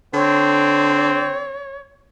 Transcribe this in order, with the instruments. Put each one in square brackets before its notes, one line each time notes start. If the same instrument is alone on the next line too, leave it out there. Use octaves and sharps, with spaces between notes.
[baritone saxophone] D3 [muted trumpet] C4 [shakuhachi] C#5